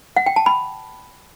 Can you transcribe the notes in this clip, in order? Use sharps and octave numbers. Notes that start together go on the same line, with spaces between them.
F#5
G5
A5
B5